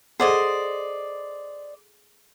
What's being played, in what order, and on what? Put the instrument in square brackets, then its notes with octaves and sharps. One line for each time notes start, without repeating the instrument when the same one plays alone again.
[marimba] G#4 A4 F#5 [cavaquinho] C5 D5 D#5